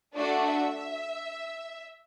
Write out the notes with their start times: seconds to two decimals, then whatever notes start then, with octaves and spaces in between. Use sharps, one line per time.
0.15 A3 D4 F#4 D5
0.45 E5